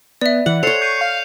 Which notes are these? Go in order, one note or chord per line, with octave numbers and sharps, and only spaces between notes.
B3 D5 E5
E3 F#5
A4 C5 C#5 C7 C#7 F7
C#6 G6 C7 D#7
F5